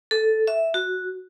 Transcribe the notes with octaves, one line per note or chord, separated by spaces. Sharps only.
A4
E5
F#4